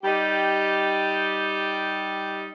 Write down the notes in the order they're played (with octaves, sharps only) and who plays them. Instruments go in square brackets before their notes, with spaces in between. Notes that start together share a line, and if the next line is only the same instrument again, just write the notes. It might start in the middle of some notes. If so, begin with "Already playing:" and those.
[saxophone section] G3 D#4 G4